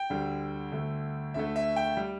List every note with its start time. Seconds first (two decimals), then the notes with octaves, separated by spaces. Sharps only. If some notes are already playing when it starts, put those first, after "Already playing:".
Already playing: G5
0.10 D2 D3 G3
0.72 D2 D3 A3
1.34 D2 D3 A3 E5
1.56 E5
1.76 G5
1.97 G3